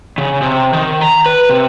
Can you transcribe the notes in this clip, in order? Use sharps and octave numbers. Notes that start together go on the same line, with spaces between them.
C#3
C3
D#3
A#5
B4
C3